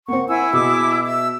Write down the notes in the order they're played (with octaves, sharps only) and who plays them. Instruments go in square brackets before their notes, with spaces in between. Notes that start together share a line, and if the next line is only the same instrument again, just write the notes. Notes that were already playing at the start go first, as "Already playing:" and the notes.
[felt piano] A#3 C4 [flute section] F#5 C#6
[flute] E4 [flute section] F#5 G#5 E6
[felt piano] B2 [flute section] G#4 D6 E6
[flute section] E5 [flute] E6